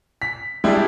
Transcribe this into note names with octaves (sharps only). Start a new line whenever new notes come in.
B6
G3 G#3 D4 E4 G4